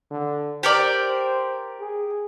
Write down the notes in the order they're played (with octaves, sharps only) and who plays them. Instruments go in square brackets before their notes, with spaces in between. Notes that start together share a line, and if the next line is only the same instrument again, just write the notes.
[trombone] D3
[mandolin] G4 A#4 D5 [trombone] C5
[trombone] G#4